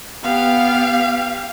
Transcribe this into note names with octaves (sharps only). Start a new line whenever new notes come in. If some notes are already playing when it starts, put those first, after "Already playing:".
B3 G4 F5